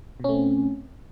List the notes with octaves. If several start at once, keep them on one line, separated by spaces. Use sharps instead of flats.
B2 A3 C4 C#4